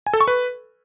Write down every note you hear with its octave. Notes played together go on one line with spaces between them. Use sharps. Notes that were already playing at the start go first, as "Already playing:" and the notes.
G#5
A4
C#6
B4